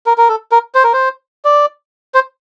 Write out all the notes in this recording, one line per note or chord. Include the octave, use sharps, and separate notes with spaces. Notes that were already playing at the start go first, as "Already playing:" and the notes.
A#4
A#4
A4
A#4
C5
A#4
C5
D5
C5